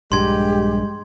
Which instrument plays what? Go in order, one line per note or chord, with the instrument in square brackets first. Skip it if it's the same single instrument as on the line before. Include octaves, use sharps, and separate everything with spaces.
[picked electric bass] A#1 G2 [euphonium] G#3 [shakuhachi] G4 [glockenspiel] C6 G#6